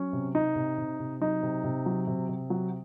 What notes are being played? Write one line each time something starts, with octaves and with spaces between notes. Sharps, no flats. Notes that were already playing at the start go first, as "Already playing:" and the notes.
Already playing: F#3 C#4
C3
C3 D#4
C3
C3
C3
F#3 D#4
C3
C3
F#3
C3
C3
F#3